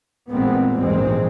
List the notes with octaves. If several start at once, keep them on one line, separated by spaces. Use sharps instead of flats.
A1 A#2 G#3 B3 C4
A#1 E2 G#2 G3 G#3 C4